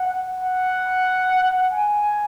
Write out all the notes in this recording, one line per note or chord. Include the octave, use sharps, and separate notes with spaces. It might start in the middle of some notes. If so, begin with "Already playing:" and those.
Already playing: F#5
F#5
G#5